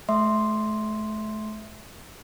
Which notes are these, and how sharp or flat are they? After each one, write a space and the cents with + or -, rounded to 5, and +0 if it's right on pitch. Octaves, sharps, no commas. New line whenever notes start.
A3 -35 E5 +0 C6 +0